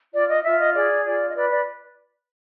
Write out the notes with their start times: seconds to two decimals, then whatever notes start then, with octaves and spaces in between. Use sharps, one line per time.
0.14 F4 D5
0.29 D#5
0.44 F4 E5
0.59 D#5
0.74 G#4 D5
1.05 F4 D5
1.28 D#5
1.35 B4 D5
1.50 D5